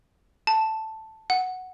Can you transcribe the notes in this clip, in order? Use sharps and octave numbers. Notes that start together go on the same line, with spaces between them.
A5
F#5